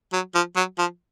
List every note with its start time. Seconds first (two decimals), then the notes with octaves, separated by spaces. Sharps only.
0.13 F#3
0.34 F3
0.56 F#3
0.78 F3